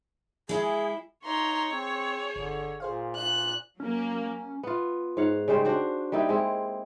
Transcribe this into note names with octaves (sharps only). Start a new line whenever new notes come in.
G#3 E4 G#4
D#4 C#5 A#5 C6
C4 G#4
G1 D3
A#2 G#4 C5 F5
A#2 F#6
F#3 A#3 C#4
B3 F4
G#2 C#5 F5 F#5
C#3 G3 G#3 C5
D4 F#4 C5
G3 A#3 D#4 E4
G#3 C4 E4